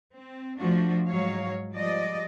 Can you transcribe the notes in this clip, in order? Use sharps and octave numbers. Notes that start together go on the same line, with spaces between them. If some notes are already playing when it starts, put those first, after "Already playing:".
C4
F3 A3 D4 F#4
G#2 F#3 C#5 F5
F3 G3 G#3 D5 D#5